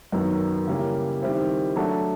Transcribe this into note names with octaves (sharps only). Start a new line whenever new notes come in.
F#2 D#3 F#3 B3
C#3 E3 G3 A#3 C#4
D#3 G3 C4 E4
F#3 A3 D4 F#4 A4